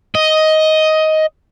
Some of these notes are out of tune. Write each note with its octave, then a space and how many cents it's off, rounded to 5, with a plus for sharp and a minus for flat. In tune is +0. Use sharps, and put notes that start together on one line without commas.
D#5 +10